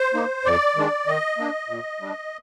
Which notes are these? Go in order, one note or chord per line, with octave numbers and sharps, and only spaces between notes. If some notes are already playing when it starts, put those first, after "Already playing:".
Already playing: C5
A#3 D#4
F2 D5
D#3 G#3 D4
D#3 D#5
A#3 D4
A#2
G3 D4